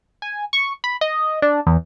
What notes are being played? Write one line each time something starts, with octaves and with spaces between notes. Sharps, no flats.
G#5
C#6
B5
D#5
D4
E2